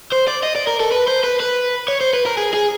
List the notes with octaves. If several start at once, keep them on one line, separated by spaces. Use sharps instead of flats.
C5
D5
D#5
D5
A#4
A4
B4
C5
B4
B4
C#5
C5
B4
A#4
G#4
G#4